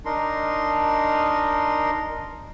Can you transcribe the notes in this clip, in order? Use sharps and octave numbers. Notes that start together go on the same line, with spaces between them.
D4 D#4 A#4 C6